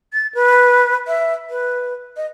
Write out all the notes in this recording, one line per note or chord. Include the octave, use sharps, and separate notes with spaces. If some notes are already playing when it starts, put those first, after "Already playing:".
A6
B4
E5
B4
D#5